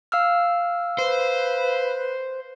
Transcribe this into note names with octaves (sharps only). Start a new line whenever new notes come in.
F5 E6 F6
B4 C5